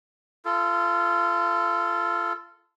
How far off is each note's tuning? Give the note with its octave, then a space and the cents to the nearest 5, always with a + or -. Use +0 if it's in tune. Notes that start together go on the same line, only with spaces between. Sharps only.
F4 -25 A4 +0